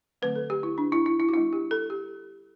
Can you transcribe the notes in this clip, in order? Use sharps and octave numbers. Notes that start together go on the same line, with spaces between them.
D3 F#3 A3 C4 B4
A4
G4
E4
D4
E4
E4
E4
F#4
G3 B3 D4 E4
G4
A4
G4